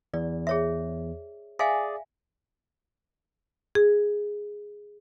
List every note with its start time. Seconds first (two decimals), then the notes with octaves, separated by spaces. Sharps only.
0.14 E2 D5
0.47 G#4 C#5 E5
1.59 G#4 D5 E5 F5 G#5
3.75 G#4